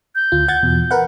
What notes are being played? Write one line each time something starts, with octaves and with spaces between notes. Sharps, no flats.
G6
D2 F4
F#5 G#6 A6
E2 B2
A#4 B4 F#5